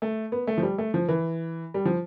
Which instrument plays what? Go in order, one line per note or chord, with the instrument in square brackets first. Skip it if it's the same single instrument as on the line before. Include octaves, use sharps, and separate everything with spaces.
[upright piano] A3
B3
A3
F3
G3
A3
F3
E3
G3
F3